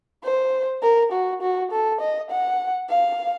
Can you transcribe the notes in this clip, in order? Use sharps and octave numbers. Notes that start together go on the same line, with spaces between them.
C5
A#4
F#4
F#4
A4
D#5
F#5
F5